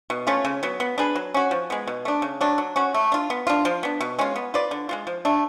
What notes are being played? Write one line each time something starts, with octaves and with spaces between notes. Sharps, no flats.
B2
A3 C#4 F4
C#3
F#3 B3
B3
D4 G#4 B4
F#3
C#4 F#4
F3
G#3 B3
B2
A3 D4
C#3
F#3 A3 D4
F#3
C#4 F#4
A3
D4 F4
B3
D4 F4
F3
B3 D4
B2
G#3 C#4 F4
B3
F4 B4 D5
D3
G#3 B3 F4
F3
A3 D4